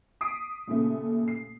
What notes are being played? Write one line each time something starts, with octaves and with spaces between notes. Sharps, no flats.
D6 D#6 B6 C7 D7 D#7
D#2 A#2 C#3 A3
C7